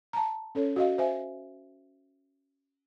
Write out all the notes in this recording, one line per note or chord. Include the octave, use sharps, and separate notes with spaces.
A5 A#5
C#4 A4 C#5
F#4 D#5 F5
C5 E5 G#5